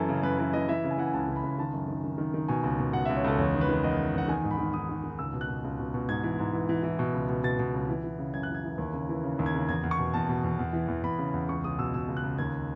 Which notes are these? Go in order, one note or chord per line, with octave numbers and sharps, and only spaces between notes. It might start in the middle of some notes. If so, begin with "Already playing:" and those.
Already playing: F#2 E3 A4
C#3
F#2 B4
E3 B4
E3 D#5
E3 E5
C#3
G#5
E3 F#5
G#5
C#2 A5
C#2
B5
C#2
D#3 A5
F#2
D#3
D#3
D#3
D#3
B2 G#5
C#2
B2
B2 F#5
C#2 E5
C#5
C#2 A4
E2 C#5
D#3
B4
D#3
E2 D#5
D#3
E2 F#5
D#3 G#5
G#2
B5
D#3
D#3 D#6
D#3
D#3
C#2 E6
B2
F#6
B2
C#2
B2
B2
G#2 G#6
E3
G#2
E3
E3
E3
B2
C#2
B2
B2 A6
B2
C#2
E3
E3
C#3
F#2 G#6
F#6
E3
G#6
E3
D#2
C#3
E3
C#3
D#2
G#6
C#3
E2 G#6
E2
C#6
B2
E2 A5
B2
E2
E2
E3
E2
E2 B5
C#3
E2
C#2 C#6
C#2 D#6
B2 E6
B2 E6
C#2
F#6
C#2
D#2 G#6